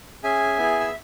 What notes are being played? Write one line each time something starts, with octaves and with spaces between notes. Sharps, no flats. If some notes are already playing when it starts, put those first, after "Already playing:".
C#4 G#4 E5 G#5
B3 E4 G#4
E6